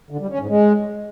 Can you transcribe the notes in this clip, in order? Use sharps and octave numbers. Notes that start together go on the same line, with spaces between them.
D3
G3
C#4
G#2
G#3